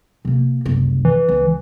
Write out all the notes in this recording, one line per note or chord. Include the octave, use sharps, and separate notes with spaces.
C3 A#3
F#1 C2
E3
C#2